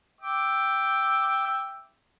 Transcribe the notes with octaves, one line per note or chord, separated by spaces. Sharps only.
E5 G5 D6